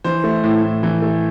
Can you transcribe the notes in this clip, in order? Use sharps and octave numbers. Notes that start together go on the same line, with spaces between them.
E3 C5
A3
A2
A2
E3
A3